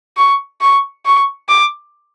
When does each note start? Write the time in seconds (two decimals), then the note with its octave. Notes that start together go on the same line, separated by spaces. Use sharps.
0.17 C#6
0.61 C#6
1.05 C#6
1.49 D6